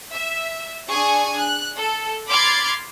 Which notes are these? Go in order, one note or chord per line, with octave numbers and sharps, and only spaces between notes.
E5
D4 G#4 G#5 C#6
F#6
A4
B5 C6 D6 F6 G#6 A6